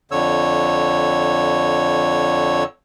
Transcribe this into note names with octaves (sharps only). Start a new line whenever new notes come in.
F2 D3 C#5 E6